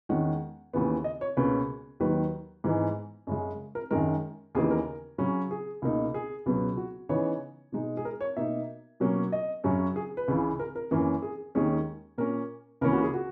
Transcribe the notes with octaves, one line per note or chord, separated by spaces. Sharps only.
E2 D#3 G#3 C#4 F#5
D#2 C#3 E3 B3
D#5
C#5
C#2 B2 A#3 C#4 B4
D#2 D#3 F#3 B4
G#2 E3 G#3 B3 D#4
F#2 C#3 G#3
A#4
F#2 D#3 G#3 A#4
D#2 C#3 E3 B3 D#4 G#4
A#4
C#3 F#3 C#4
G#4
C#2 B2 A#3 D#4
G#4
C#2 B2 F#3 B3
F#4
C#3 E3 B3 D#4 C#5
B2 G#3 D#4
G#4
A#4
C#5
B2 A#3 D#4 E5
B2 F#3 A#3 C#4
D#5
F#2 C#3 F#3 C#4
G#4
B4
C#2 C#3 E3
A#4
A#4
F#2 E3 A#3 C#4
G#4
D#2 D#3 G#3 C#4 G#4
A#2 A#3 C#4 A#4
C#2 C#3 E3 A#3 C#4 A#4
F#4
G#4
F#4